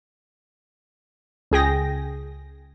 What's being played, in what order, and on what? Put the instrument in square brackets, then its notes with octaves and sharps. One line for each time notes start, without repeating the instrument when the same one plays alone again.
[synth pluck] C#2 G#4 G5 A#6